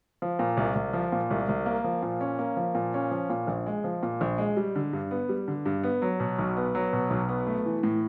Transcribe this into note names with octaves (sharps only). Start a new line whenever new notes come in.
F3
A#2
C2
C2
F3
A#2
C2
C2
A#3
F3
A#2
C#4
A#3
F3
A#2
C#4
F3
A#2
A#1
G#3
F3
A#2
A#1
G#3
G3
D3
G2
B3
G3
D3
G2
B3
F#3
B2
B1
B3
F#3
B2
B1
B3
A3
E3
A2